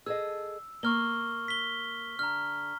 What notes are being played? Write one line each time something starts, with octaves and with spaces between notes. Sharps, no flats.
G#4 A4 D#5 E6
A#3 C#6 F6 G7
B6 G7
D3 A#5 F6